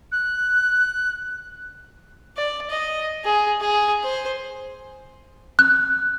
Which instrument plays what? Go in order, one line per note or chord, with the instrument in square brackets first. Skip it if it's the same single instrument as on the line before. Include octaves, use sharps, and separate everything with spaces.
[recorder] F#6
[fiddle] D5
D#5
G#4
G#4
C5
[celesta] F#6